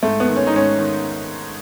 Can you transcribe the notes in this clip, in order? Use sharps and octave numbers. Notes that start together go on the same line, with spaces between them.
G#2 A3
B3
D#3
C#4
D#4
G#2 C#4
D#3